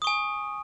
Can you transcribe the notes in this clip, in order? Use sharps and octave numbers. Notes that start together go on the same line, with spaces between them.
G#5 C#6 D#6